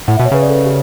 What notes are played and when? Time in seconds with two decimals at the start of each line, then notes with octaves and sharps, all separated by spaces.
0.08 A2 F#5
0.17 B2 E5
0.25 C#5
0.32 C#3 B4
0.42 D5
0.49 A4
0.54 B4
0.66 G4